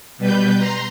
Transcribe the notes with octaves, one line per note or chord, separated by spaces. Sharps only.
B2 G3 B4 G6
A#5 C6